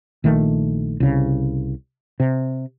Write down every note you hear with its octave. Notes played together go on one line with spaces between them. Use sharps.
A#1 D#3 A3
C2 C#3
C3